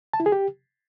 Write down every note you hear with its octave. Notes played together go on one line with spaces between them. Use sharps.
A5
E4
G#4
G4